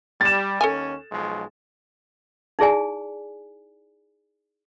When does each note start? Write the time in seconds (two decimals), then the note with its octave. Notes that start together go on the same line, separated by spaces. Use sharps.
0.21 G3 A6 E7
0.61 D#2 C#4 A4 A#4 G#5
1.11 B1 F3 G#3
2.59 D#4 E4 G#4 D5 G#5